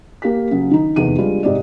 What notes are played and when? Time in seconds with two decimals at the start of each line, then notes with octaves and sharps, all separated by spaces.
0.22 A#3 G4 B6
0.51 C#3 F#3
0.71 D#3 D#4
0.96 F1 E2 D#3 G#4 D#7
1.18 G3 G#3 D4 F4
1.43 G#2 C3 C4 G4 D5